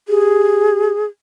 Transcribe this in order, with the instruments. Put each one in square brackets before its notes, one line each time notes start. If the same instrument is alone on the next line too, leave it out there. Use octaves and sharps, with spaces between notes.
[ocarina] G4 [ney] G#4